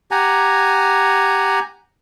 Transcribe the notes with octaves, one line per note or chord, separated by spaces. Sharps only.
G4 F#5 G#5 A#5